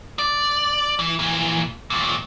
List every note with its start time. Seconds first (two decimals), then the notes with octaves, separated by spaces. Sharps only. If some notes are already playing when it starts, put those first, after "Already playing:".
0.19 D5
0.99 E3
1.19 A#2 E3
1.90 D#2 A#2